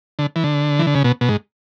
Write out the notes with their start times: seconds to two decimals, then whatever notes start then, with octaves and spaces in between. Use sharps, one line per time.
0.19 D3
0.36 E3
0.44 D3
0.79 E3
0.87 D3
0.95 C#3
1.04 B2
1.21 B2
1.29 G#2